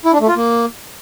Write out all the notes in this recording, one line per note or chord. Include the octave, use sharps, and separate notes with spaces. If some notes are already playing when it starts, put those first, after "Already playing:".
E4
D4
A3
F4
A#3